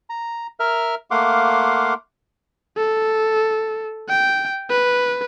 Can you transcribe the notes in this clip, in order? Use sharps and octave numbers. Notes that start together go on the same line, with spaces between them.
A#5
A#4 E5 F6
A3 A#3 F5 F#5 C6 D6
A4
G5
B4